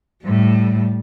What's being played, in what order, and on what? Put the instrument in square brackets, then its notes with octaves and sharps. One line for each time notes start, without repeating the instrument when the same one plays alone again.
[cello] A2 [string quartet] G3